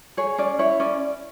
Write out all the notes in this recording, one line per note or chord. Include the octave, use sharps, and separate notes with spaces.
G#4 C#5
C#4 D5
E4 C#5
C#4 D5